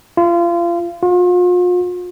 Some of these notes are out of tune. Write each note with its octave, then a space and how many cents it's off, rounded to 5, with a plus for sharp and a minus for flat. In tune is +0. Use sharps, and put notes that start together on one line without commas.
F4 -30
F4 +40